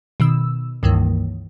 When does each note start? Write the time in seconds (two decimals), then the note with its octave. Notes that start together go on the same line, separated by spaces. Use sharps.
0.20 B2 D#3 E6
0.83 C#2 G2 D#3 E3 A#3